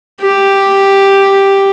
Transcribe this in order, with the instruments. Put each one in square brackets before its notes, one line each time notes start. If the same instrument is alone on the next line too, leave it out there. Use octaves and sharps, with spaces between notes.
[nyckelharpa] G4